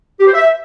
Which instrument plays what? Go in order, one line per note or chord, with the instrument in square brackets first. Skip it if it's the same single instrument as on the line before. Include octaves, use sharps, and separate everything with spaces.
[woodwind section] G4
C5
E5